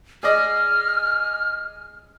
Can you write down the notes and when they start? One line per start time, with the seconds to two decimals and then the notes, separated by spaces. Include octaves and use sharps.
0.23 G#4 D5 D#5 F6